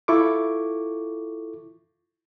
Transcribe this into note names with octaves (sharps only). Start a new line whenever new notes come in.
E4 F4 A4 C#6 D6